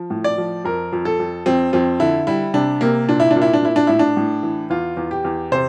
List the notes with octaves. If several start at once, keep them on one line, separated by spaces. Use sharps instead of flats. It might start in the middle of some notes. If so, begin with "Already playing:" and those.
Already playing: F3
A2
D5
F3
F2 A#4
F2
A4
F2
F2 C4
F2 C4
D3 E4
G3 E4
C3 D4
C3 A#3
A#2 D4
E4
A#2 D4
E4
D4
A#2 E4
D4
A2 E4
D4
A2
E3
E2 F4
E2
G4
E2
C3 C5